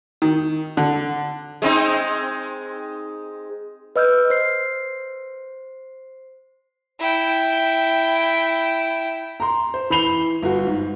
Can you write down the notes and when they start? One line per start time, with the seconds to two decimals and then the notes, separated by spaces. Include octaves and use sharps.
0.22 D#3
0.77 D3
1.62 G#3 C4 D#4
3.96 B4 D#5 E6 F6 G6
4.30 C5 C7
7.00 E4 G5
9.40 A#5 C6
9.74 C5
9.90 E3 B5 C7 F7 G7
10.42 G1 F#4
10.67 G#2